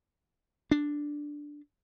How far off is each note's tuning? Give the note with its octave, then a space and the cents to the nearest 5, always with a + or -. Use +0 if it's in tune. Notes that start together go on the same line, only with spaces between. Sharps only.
D4 +0